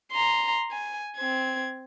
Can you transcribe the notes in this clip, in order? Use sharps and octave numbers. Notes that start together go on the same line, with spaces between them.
A#5 C6
G#5
C4 G#6